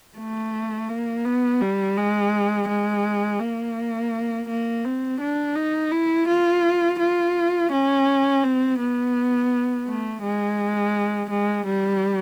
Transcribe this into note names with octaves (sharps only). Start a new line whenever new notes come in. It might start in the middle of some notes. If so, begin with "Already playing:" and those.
A3
A#3
B3
G3
G#3
G#3
A#3
A#3
C4
D4
D#4
E4
F4
F4
C#4
C4
B3
A3
G#3
G#3
G3